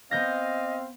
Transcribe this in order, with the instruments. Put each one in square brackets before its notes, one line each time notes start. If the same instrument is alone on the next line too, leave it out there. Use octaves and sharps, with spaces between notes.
[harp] B3 G6 A#6 [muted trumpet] C4 [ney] D#5 [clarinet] F5